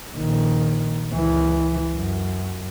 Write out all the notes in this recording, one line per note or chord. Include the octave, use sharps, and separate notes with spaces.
A#1 D#3
C#2 E3
F#2